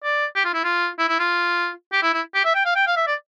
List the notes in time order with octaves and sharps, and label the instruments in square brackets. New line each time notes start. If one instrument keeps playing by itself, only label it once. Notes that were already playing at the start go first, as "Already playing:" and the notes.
[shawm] D5
G4
F4
E4
F4
E4
E4
F4
G4
E4
E4
G4
E5
G5
F5
G5
F5
E5
D5